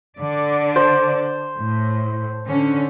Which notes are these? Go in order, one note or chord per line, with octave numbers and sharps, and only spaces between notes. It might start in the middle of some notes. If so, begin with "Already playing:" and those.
D3 D5
C5
A2
D3 C#4